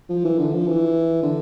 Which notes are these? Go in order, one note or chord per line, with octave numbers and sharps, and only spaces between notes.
F3
E3
D3
F3
E3
D3